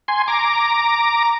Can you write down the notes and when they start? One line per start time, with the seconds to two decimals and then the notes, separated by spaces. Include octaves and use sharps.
0.08 G#5 C6
0.28 A#5 D6